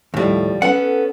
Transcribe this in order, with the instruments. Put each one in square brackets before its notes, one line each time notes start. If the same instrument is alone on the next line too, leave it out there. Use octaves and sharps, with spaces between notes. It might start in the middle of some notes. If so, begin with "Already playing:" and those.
[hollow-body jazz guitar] D#2 A2 [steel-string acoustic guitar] F3 G3
[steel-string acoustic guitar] B3 C#4 A4 [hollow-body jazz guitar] F#5